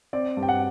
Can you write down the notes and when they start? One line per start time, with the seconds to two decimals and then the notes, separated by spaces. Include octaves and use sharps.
0.13 C4 D5
0.37 G2
0.43 G5
0.49 F#5